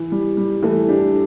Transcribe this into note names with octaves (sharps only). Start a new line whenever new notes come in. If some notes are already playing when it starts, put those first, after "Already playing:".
Already playing: E3
G3
G3
E3 A3
D4 G4